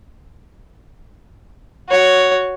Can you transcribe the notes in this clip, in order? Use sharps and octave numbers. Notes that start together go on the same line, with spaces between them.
F#4 C#5